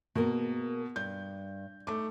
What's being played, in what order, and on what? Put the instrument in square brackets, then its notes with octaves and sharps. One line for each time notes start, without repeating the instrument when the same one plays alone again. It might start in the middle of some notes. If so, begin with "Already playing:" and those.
[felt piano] B2 [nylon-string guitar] A#3 G#4 A#4
[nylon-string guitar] G2 [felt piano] G6
[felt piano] A3 D6 [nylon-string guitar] D#4